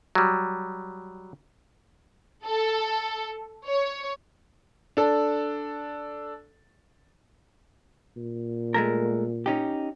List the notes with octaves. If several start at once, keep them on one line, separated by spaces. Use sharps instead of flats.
F#3 G3
A4
C#5
D4 A4
A#2
G#3 A3 A#4
C#4 D#4 G4